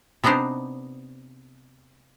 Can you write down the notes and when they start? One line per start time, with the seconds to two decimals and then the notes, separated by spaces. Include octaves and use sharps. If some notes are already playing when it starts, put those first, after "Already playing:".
0.24 C3 B3 D4 D#4 C5